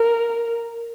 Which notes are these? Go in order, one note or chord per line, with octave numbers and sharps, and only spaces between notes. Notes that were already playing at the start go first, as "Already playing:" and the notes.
Already playing: A#4